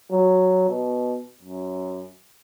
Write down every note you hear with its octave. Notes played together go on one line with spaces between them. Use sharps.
F#3
B2
F#2